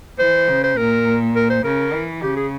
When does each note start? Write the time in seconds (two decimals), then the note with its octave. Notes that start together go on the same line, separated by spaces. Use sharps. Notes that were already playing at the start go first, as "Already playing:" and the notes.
0.19 E3 C5
0.48 C#3
0.64 C5
0.77 A#2 A#4
1.35 A#4
1.50 C5
1.64 C#3 A#4
1.94 E3
2.22 C#3 G4
2.37 G#4